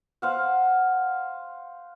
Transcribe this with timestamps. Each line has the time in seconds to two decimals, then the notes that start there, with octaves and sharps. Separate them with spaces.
0.22 C5 F5 F#5